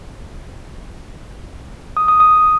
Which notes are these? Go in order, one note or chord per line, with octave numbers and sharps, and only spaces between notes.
D#6
D#6
D#6